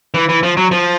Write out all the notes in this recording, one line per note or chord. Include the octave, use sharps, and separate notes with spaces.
E3
E3
F3
F#3
F3